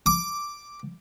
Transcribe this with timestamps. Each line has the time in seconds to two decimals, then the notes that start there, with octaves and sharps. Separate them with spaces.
0.06 D6